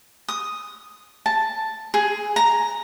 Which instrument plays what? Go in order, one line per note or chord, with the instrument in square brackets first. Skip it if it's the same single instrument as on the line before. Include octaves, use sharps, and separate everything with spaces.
[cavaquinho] D#6
A5
G#4
A#5